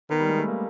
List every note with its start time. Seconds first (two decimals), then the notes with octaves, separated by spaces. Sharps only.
0.10 D#3 B3
0.20 G3
0.29 G#3
0.38 A3
0.48 A#3